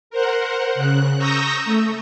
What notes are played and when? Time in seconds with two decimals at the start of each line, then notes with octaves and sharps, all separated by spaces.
0.10 A#4 C5 F#5
0.74 C#3 F#6
1.17 A#5 C#6 D#6 E6 G6 A#6
1.65 A3